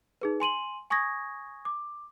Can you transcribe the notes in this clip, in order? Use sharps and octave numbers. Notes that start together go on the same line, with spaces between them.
D#4 G#4 B4
G#5 C6 D#7 F#7
G#5 C#6 D#6 G#6 A#6
D6